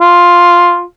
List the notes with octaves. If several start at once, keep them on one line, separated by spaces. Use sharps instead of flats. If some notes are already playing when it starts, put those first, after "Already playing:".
F4